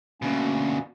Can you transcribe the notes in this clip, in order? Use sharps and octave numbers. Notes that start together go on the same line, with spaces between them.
D2 B2 A#3 C#4